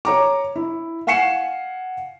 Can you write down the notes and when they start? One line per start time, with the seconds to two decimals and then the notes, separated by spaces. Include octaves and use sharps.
0.05 C#5 A#5 D6
0.56 E4
1.07 F5 F#5 G#5 C7 C#7 E7